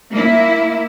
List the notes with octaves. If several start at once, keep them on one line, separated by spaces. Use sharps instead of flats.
A#3 E4